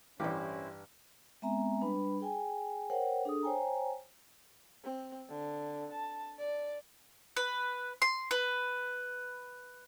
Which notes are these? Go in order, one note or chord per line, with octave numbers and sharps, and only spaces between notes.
A1 G2 C#4 E4 G4 B4 C5
G#3 B3 C4 E5 G#5 A#5
G3 D4 B4 B5
G#4 G5 G#5
A#4 C5 C#5 F#5 G5
D4 G#4 A4 D#6
C5 C#5 G5 G#5 A#5
C4
D3
A5
D5
B4
C6
B4